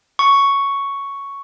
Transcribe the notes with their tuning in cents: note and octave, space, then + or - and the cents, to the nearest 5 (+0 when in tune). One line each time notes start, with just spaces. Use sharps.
C#6 +5